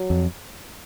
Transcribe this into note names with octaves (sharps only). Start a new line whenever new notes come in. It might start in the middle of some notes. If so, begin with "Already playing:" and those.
Already playing: F#3
F2